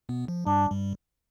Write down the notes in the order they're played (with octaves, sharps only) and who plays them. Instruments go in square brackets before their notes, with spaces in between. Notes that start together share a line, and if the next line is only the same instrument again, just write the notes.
[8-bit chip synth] B2 B3
F3
[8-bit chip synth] G2 G3 [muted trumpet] D4
[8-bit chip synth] G2 G3